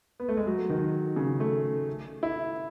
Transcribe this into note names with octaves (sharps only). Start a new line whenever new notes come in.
B3
A3
G#3
F#3
D#3
C#3
A3
E4